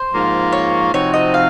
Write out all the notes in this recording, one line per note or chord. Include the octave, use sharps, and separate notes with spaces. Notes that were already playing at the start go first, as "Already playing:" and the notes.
Already playing: C5
G#2 F3 A#3 F4
C#5
C3 F3 C4 D#4 F#4 C#5
D#5
F5